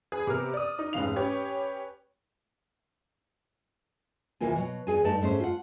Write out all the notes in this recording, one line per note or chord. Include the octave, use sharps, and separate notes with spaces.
G#4 B4
C3 B3 A#4 F6
D5 D#6
D#4
F1 G#2 C#3 F5 F7
C#4 G4 B4 C#5
D#2 C3 E3 A#3 F4 G#5
B2 F#3
E2 C3 G#4 G#5
G2 A3 D#4 D5 A5
G#2 A3 C#4 C5
F4 F#5